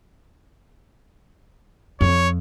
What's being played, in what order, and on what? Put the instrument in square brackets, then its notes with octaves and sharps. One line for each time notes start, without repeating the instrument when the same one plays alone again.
[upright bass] F2 [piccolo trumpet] C#5